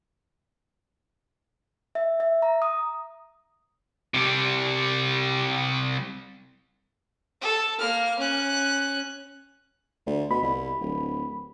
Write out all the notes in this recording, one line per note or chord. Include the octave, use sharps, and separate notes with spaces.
E5
E5
A#5
D#6
C3 G3
A4
A#3 F6
C#4 F#6
D2
B2 B5
C2
D1